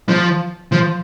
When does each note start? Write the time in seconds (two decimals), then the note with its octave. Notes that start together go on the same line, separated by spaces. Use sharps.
0.09 F3
0.72 F3